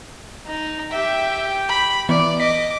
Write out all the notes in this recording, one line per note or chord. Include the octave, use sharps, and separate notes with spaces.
D#4
G4 E5 G5
B5
E3 B3 D5
D#5 D6 B6